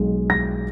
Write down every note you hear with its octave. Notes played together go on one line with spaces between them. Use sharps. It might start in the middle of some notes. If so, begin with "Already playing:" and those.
Already playing: B1 B2 G#3
A#6